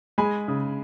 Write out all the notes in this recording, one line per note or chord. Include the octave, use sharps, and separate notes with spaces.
G#3 G#5 B5
C#3